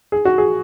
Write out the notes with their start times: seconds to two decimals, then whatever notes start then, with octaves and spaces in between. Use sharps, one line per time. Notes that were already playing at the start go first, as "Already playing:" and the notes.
0.12 G#4
0.25 F#4
0.38 G#4